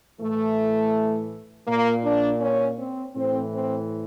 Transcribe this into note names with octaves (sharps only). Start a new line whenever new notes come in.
A2 E3 A3
A#2 A#3
D4
C#4
C4
A2 E3 C4
C4